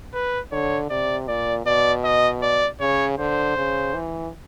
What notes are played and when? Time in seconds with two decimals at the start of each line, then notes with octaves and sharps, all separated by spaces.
0.14 B4
0.52 D3 C#5
0.90 C3 D5
1.28 A#2 D5
1.66 B2 D5
2.04 D#5
2.42 D5
2.80 C#3 C#5
3.19 D3 C5
3.57 C#3
3.94 E3